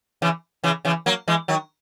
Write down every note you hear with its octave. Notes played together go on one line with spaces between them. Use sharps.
C#3 E3
C#3 E3
C#3 E3
F#3 A#3
E3 G#3
D#3 F#3